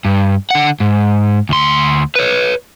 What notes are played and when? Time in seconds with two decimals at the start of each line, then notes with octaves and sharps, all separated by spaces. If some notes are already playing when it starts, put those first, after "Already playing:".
0.05 G2
0.51 D3 F#5
0.80 G#2
1.49 D2 C6
2.15 B4 C#5